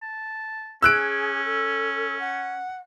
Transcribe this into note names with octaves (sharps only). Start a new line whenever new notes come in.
A5
C#4 G#4 E6 F#6 D7
A4
F#5